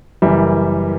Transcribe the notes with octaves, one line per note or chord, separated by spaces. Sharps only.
F#1 F#2 E3 G3 E5